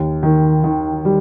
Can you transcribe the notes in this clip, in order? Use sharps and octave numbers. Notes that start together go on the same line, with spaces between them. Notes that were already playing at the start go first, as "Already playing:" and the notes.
Already playing: D#2
D#3
D#3
G3